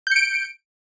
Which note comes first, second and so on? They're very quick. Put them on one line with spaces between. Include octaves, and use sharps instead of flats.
G6 C#7 D7